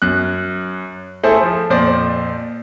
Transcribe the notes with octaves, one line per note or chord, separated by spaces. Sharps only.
F#2 F#6
A3 E4 G#4 A4 C5
F3
F2 A#2 C5 D5